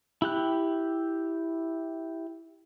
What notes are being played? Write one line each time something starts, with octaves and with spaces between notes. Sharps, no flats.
E4 G4 F#6